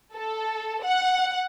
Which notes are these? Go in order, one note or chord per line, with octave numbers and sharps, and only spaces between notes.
A4
F#5